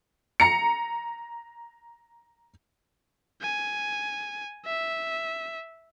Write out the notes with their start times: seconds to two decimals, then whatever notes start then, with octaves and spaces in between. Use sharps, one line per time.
0.40 A#5 C#7
3.42 G#5
4.66 E5